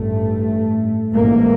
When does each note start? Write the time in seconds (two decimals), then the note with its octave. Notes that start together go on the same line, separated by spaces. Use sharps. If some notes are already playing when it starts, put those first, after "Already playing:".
Already playing: A1 G2 A3
1.17 A1 G#2 A#3